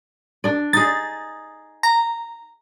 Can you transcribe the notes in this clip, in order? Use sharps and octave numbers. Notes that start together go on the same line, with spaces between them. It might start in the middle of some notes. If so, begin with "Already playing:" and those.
D4 D5
D#4 G#4 A6
A#5